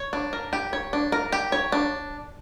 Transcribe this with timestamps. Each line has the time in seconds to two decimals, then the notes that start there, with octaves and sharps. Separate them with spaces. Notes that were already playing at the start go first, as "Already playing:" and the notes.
Already playing: C#5
0.13 D4
0.33 A#4
0.53 G4
0.73 C#5
0.93 D4
1.12 A#4
1.32 G4
1.52 C#5
1.72 D4